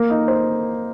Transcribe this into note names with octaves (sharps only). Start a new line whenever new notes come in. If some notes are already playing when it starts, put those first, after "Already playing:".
Already playing: A#3
D#4
C5